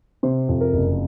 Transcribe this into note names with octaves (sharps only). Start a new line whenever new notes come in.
C3 C5
F2
A#4
F#1